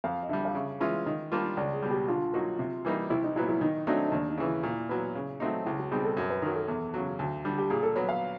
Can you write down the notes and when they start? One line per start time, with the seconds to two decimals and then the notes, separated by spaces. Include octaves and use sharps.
0.04 F2 F5
0.23 D#5
0.29 D3 G3 E5
0.45 F5
0.55 C#3 E5
0.80 E3 G#3 C#4 F4 E5
1.06 D#3 D#5
1.32 G3 A#3 D4 F4
1.57 C#2 D5
1.73 G#4
1.82 B2 G3
1.91 G4
2.08 D3 F4
2.34 F#3 A#3 D#4 F#4
2.59 C3
2.85 E3 G3 A#3 D#4
3.10 C2 E4
3.24 D#4
3.36 A#2 F#3 B3 E4
3.49 E4
3.61 D#3 D#4
3.87 F#3 A3 C4 D4 D#4
4.08 D#4
4.12 D#2 D4
4.30 D#4
4.37 C#3 E3
4.46 E4
4.63 A#2 E4
4.89 F#3 B3
5.15 C#3
5.40 F#3 A3 C4 D#4
5.65 C#2 E4
5.79 F#4
5.91 B2 G3 C4 D#4 G#4
6.04 A4
6.17 F#2 A#4
6.30 B4
6.42 D#3 A#4
6.46 F#3
6.55 A4
6.68 E2
6.94 C#3 F#3
7.19 D2
7.45 D3 G3
7.58 G4
7.70 A#2 G#4
7.83 A4
7.96 F#3 B3 C#5
8.09 F5